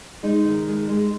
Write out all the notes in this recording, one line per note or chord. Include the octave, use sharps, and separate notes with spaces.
G#3 D#4
D#3
G#3
G#3